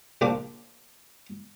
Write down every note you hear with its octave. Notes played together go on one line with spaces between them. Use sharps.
A#1 F3 A#3 D4 D6